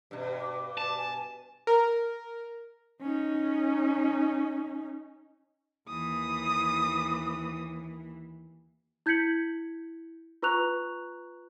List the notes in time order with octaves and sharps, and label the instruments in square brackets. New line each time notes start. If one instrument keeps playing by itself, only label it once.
[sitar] G2 B2
[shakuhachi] D6
[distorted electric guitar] A5 [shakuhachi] D6
[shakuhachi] G#5
[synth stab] A#4
[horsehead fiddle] C#4 D#4
[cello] D#2 E3 [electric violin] D#6
[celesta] E4 G6 G#6 B6 C#7 F#7
F4 B4 A#5 C#6 F#6 F7